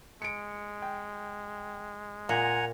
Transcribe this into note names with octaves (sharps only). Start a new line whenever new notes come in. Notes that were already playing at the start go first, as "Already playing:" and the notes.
G#3 C#7 D7
G5
A#2 F4 F#5 G#5 A#5